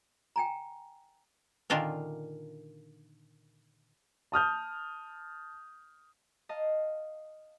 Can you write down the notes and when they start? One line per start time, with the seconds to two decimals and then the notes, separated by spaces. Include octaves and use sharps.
0.36 G5 G#5 A#5
1.70 A#2 D3 D#3 D4 F4 A#4
4.32 A5 D#6 F6 G6
6.49 D#5 F5 A5